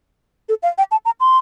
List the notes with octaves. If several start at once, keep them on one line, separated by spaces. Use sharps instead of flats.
A4
F5
G5
A5
A#5
C6